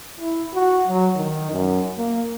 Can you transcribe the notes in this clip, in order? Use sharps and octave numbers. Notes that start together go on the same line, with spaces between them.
E4
F#4
F#3
D#3
F#2
A#3